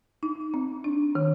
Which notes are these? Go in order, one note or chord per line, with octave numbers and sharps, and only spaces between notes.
D#4
C4
D4
D#3